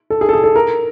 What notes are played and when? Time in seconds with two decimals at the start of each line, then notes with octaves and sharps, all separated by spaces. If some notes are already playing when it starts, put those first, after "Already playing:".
0.10 A4
0.21 G#4
0.29 A4
0.33 G#4
0.44 A4
0.56 A#4